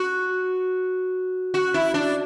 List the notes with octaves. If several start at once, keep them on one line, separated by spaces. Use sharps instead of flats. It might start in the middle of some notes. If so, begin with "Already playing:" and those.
Already playing: F#4
F#4
E4
D4